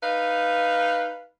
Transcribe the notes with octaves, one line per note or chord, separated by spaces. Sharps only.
D#4 B4 F5